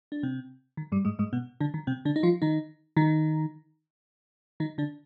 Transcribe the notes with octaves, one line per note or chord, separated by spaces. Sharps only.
D4
C3 C4
D#3
G2 G3
G#2 G#3
G#2 G#3
B2 B3
D3 D4
D#3
C3 C4
D3 D4
D#4
F3 F4
D#3 D#4
D#3 D#4
D#3 D#4
D3 D4